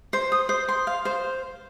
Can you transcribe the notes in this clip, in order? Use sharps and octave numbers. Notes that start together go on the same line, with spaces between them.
C5
D#6
C5
C6
F5
C5